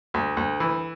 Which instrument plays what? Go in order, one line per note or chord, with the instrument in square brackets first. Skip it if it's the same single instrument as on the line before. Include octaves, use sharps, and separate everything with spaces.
[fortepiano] D2
D2
E3